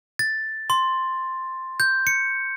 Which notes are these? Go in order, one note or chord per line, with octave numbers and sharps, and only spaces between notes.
A6
C6
G6
C#7